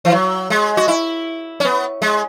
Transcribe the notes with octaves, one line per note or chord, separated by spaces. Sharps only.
E3
F#3
G#3
F#4
E4
C#4
B3
G#3